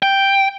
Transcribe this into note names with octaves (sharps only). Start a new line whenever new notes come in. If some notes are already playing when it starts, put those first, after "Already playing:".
G5